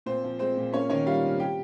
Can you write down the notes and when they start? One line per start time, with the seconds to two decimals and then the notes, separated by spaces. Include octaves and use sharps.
0.06 A#2 C4 C5
0.24 F3
0.39 G#3 C4 C5
0.57 A#2
0.73 A#3 C#4 C#5
0.90 D#3 C#4 C#5
1.06 G3 F4 F5
1.23 C3
1.40 G4 G5